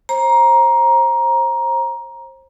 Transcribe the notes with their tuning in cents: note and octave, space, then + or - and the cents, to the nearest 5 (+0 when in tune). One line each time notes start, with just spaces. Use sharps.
C5 +25 A#5 +15